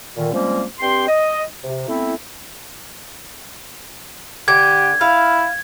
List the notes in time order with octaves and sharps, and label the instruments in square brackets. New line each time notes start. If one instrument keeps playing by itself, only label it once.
[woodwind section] A#2 D3 D#3
F3 G3 G#3 A#3 C4 C#4
G2 C4 G4 G5 C6
D#5
C3
A3 B3 C4 E4
[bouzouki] D3 [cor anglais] G4 [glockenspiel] G#6
[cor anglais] E4 [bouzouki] F5